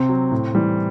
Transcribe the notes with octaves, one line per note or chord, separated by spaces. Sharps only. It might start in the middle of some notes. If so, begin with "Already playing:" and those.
Already playing: C3 C4
F#3
A2
E3 G3